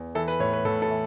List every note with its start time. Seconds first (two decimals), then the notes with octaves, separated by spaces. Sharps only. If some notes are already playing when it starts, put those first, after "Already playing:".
Already playing: E2
0.15 E3 A4
0.28 B4
0.40 A2 C#5
0.53 B4
0.65 A2 A4
0.82 A4
0.90 E3